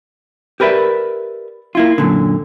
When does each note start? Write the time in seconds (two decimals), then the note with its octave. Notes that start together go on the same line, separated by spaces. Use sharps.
0.60 G4 A#4 B4 D5 E5
1.75 A#3 E4 F4
1.98 F#2 A#2 D3